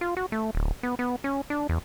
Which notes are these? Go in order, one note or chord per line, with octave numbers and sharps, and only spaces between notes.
F4
F#4
A3
D1
B3
B3
C#4
D4
E2